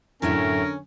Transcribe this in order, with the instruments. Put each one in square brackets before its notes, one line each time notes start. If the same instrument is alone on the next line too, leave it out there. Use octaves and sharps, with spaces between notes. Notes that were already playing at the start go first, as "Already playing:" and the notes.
[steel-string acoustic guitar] F#2 A2 A3 [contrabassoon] D3 [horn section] C#4 [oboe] A#4